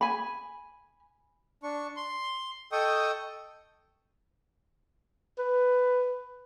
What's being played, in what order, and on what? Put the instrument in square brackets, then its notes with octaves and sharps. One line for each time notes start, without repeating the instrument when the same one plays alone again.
[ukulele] G#5 B5
[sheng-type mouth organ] D4 C#6
C6
A4 D#5 G5 C#6 D#6
[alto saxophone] B4